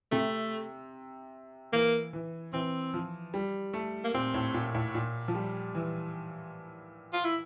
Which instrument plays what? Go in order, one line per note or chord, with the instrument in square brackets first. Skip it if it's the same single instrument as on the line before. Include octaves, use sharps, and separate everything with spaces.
[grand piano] C3 [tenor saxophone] A3
[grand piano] E3 [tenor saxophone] A#3
[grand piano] E3
[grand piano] E3 [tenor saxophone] C4
[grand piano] F3
G3
A3
[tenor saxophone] A#3
[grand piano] A#2 [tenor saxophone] C4
[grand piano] A2
A#2
A2
A#2
F3
G3
E3
[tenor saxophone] F4
E4